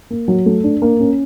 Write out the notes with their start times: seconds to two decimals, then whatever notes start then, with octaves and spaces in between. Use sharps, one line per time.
0.10 A#3
0.28 F#3
0.46 A3
0.64 D4
0.82 A#3
1.00 C#4